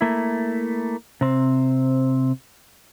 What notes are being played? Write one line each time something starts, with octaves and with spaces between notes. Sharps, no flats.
A3 A#3 E4
C3 C4